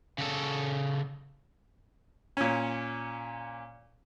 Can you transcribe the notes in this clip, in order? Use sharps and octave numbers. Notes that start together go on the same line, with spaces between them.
C#3 A4
A#2 C#4